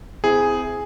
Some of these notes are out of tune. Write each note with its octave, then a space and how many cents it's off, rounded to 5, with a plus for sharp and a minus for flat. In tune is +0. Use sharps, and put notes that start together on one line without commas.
C4 -25 E4 +0 G#4 +0